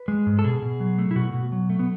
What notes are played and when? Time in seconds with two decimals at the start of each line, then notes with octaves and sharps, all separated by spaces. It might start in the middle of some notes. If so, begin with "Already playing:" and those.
Already playing: B4
0.08 G#3
0.26 G#2
0.39 A4
0.44 B2 G#4
0.62 B2
0.80 F#3
0.99 A3
1.11 E4
1.16 B2 F#4
1.34 B2
1.52 F#3
1.70 A3
1.79 B3